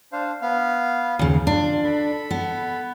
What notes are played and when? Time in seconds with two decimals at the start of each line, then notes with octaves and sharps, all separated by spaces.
0.12 D4 C5 F5
0.42 B3 F5
1.19 D#2 C#3
1.47 D4 F4
1.84 A4 B5
2.31 B3